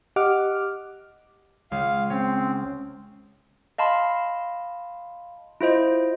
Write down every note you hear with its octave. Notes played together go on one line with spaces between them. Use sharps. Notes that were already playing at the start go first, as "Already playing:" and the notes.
G4 D#5 F#5 D6 F6
C#2 F5
C4 C#4
D#5 F5 A5 B5 C6
E4 F4 C5 D#5